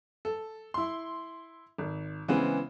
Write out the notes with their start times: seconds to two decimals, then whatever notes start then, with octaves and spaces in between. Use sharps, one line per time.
0.25 A4
0.74 E4 C6
1.78 G#1
2.28 C#3 E3 G#3 B3 C4